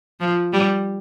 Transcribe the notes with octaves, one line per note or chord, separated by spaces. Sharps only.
F3
G3